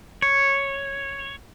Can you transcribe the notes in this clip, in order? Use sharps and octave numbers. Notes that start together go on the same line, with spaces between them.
C#5